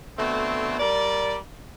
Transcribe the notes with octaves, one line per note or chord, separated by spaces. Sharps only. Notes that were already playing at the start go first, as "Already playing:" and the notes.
B2 D3 A3 C4
G3 A#4 D5